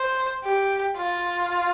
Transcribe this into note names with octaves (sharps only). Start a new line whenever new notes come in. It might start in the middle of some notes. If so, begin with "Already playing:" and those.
Already playing: C5
G4
F4